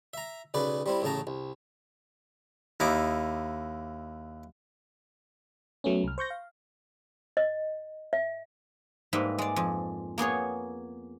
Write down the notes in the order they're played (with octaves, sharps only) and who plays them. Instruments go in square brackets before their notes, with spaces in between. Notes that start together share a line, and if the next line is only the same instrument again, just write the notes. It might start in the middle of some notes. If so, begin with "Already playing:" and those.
[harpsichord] E5 A#5
B1 C#3 B4 D5
G3 C4 E4
A1 A2 C#3 A5 A#5
C2
D#2 D#4 E4 D6
[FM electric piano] F#3 A3 B3 C#4
C2 F6
C5 C#6 G6 A#6
F5
[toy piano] D#5
E5
[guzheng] G#2 G3 A#3 B4 E5
G#3 D5
F2
A#3 B3 G#4 C#5